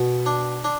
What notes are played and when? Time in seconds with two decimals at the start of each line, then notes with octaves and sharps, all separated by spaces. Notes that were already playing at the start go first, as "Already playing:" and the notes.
Already playing: B2
0.26 D4
0.64 D4